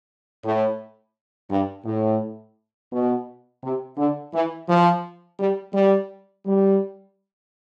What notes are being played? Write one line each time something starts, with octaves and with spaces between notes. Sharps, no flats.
A2
G2
A2
B2
C3
D3
E3
F3
G3
G3
G3